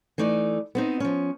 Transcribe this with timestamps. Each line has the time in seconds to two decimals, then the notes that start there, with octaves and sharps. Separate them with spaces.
0.18 E3 A3 D#4 D5
0.75 B3 C4 D#4
1.00 F3 C#4